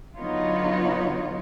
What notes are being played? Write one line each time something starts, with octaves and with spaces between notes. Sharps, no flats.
D3 F#3 B3 D#4 F4 C#5